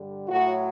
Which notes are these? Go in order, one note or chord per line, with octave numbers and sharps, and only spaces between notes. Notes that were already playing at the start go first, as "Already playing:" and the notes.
Already playing: G2 D3 G3
A2 F#3 F#4